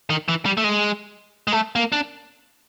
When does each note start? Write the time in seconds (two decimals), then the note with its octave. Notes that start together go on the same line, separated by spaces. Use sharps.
0.10 D#3
0.28 E3
0.46 G3
0.57 A3
0.64 G#3
1.48 G#3
1.52 A3
1.75 A#3
1.92 D4